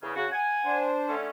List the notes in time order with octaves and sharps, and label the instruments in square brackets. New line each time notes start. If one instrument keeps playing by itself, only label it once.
[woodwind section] E2 C#3
C#3 F#4
F#5 G#5
[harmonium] D4 C5
[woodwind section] D3 A3 C#4